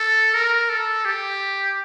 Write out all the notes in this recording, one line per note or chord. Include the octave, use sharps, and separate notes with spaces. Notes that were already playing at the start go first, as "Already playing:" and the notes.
Already playing: A4
A#4
A4
G4